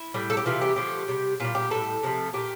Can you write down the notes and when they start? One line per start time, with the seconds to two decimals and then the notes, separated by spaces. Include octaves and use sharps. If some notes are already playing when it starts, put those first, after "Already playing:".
Already playing: E4
0.14 A2 G3
0.30 A4
0.37 G4
0.45 C3 E3 G3 F4
0.62 G4
0.76 D3 F3 A3 G4
1.08 C3 G3
1.40 A#2 G3 F4
1.55 G4
1.70 A2 G3 A4
2.03 C3 F3 A3
2.33 A#2 A3 G4